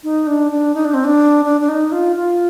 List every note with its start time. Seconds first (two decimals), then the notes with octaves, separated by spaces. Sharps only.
0.04 D#4
0.27 D4
0.51 D4
0.75 D#4
0.85 D4
0.94 C4
1.04 D4
1.45 D4
1.61 D4
1.69 D#4
1.92 F4
2.16 F4